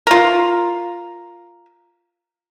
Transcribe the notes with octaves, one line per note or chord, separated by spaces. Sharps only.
F4 A#4